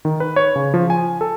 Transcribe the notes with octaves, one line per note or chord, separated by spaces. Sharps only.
D#3
B4
C#5
C#3
F3
G#5
A4